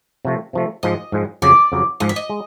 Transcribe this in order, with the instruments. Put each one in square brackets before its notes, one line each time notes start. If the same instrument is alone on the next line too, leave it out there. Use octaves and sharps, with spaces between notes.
[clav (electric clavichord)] C3 F3 A3
C3 F3 A3
[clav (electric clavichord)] G#2 F3 G#3 [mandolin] D#5
[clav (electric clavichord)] G#2 F3 G#3
[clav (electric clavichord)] F2 C#3 F#3 [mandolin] D5
[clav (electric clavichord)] F2 C#3 F#3
[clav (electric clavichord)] G#2 F3 G#3 [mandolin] D#5
[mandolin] E5
D#5
[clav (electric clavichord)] G#3